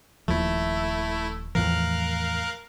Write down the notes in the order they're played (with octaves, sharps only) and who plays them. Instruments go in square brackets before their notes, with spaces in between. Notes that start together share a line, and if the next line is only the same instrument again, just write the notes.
[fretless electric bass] D#1 D#2 F3 [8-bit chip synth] A3 E4
[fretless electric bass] E2 A2 F3 [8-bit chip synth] A#4 F5 F#6